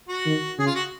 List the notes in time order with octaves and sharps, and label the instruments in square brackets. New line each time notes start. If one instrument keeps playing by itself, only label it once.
[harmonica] F#4
[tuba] D#3
[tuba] C#3 [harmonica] G#4
[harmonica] F4
F#4